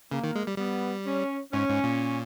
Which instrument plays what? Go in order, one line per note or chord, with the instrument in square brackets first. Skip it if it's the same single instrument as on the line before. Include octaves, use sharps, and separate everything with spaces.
[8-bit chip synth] C#3 [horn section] A#3
[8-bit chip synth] D#3
G#3
G3
[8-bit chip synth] G3 [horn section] B3
[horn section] C#4
[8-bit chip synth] G#2 [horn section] C#4
[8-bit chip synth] G#2
A#2